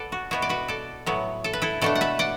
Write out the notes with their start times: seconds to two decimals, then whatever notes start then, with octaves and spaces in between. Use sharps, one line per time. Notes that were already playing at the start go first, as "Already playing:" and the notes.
Already playing: A4 B4 D5 F#5
0.12 F#4
0.31 B2 B3 E4 F#4
0.42 D5
0.49 F#4 B4
0.68 A4 D5
1.06 A2 F#3 B3
1.44 A4
1.53 B4
1.62 E4 A4
1.81 B2 A3 D4 A4 D5
1.95 F#5
2.01 B4 E5
2.19 D5 F#5